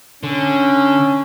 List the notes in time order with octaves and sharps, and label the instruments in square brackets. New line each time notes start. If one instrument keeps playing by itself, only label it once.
[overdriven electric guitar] D3 [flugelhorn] C#4